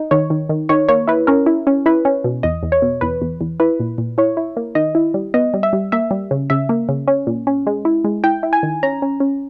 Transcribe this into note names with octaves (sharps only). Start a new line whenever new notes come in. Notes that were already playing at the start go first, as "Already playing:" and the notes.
Already playing: D#4
D#3 C#5
D#3
D#3
D#3 C#5
A#3 C#5
E4 B4
C#4 A#4
E4
C#4
E4 B4
C#4
B2
E2 D#5
E2
C#5
B2
E2 B4
E2
E2
E4 B4
A#2
A#2
E4 C#5
E4
A#3
D#3 D#5
E4
G3
B3 D#5
G3
E5
G3
A#3 E5
G3
C#3
C#3 E5
A#3
C#3
C#4
A#2
C#4
G#3
E4
G#3
E4 G5
E4
G#5
D#3
C#4 A#5
C#4
C#4